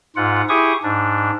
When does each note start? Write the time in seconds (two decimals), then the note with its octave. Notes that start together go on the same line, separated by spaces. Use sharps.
0.16 G#2 F4 F#5
0.49 E4 G4 G#4 C#6 D#6
0.83 G#2 D4